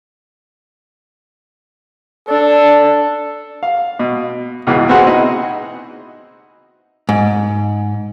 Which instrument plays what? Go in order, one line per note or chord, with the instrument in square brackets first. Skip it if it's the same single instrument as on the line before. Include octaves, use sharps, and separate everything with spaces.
[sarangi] D4 [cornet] A4
[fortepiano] F5
B2
C#2 G#2 B2 E3
B3 C4 F#4 G#4 F#5 C6
D#4 E4 D#5
[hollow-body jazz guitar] G#2